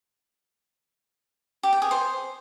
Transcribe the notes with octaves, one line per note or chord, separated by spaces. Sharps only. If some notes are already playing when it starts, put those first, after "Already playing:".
G4
G5
G#4
C5